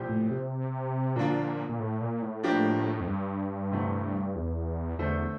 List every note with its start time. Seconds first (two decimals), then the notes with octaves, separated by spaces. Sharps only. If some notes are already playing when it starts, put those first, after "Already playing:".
Already playing: C2 A#2 F3 C4 G4
0.09 A2
0.31 C3
1.16 A#2 D3 F3 A#3 D4 F4
1.69 A#2
1.80 A2
2.01 A#2
2.22 A2
2.43 F3 A#3 D4 G4
3.01 F2
3.07 G2
3.71 D2 C3 E3 A3 C4
4.36 E2
4.99 E2 D3 A3 E4 A4 C5